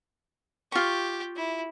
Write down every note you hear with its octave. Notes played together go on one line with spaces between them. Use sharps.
F4 G4 C#6
E4